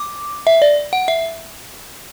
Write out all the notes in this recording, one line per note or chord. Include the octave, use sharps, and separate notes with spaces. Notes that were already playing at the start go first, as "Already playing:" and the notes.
Already playing: D6
E5
D5
F#5
E5